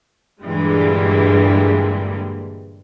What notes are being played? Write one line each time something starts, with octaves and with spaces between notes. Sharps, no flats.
G2 A#2 D3 E3 G3 G#3